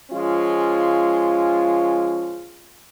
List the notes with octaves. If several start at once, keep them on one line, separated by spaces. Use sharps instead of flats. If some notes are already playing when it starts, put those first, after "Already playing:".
F3 G#3 C#4 F4